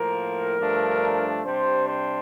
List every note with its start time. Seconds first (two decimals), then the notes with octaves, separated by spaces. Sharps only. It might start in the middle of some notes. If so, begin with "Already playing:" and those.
Already playing: A2 F3 A#3 A#4
0.58 G2 F3 A3 D4
1.44 C3 G3 D4 C5
1.88 C5